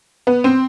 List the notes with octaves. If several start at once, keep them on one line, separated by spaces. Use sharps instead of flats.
B3
C4